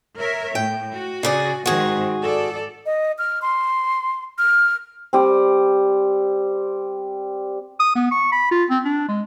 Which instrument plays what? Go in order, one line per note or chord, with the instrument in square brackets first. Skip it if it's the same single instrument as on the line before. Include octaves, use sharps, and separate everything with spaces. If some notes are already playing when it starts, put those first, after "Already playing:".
[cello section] A#4 C#5 E5
[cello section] A2 [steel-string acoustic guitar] G5
[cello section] F#4
[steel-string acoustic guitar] C#3 G#4 D5
[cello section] G#2 D#3 C4 [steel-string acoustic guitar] F#4 G#4
[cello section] A4 D5
[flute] D#5
F6
C6
F6
[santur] G3 C4
[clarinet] D#6
B3
C#6
B5
F4
C4
D4
G#3